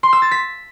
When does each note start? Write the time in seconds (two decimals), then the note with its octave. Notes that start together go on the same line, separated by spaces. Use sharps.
0.03 C6
0.13 E6
0.22 A6
0.31 B6